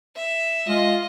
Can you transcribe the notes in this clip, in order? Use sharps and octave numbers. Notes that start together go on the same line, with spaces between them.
E5
G#3 F4 D#5